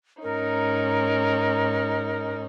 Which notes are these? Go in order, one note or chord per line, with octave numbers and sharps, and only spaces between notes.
G#2 C#4 D#4 A#4